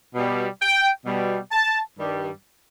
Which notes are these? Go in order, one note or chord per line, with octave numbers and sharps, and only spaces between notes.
B2 G3
G5
B2 G3
A5
G2 D#3 G3